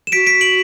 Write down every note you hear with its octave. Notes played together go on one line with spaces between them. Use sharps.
E7
F#4 B6 D7
B6 D7
D7 F#7